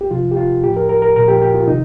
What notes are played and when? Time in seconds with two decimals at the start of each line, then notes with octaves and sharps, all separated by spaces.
0.01 G4
0.11 C3 F3 F4
0.31 G4
0.37 F4
0.63 A2 F3 G4
0.77 A#4
0.89 A#4
1.02 A#4
1.16 A#2 F3 A#4
1.28 G4
1.42 G4
1.54 F4
1.68 C3 D#3 D#4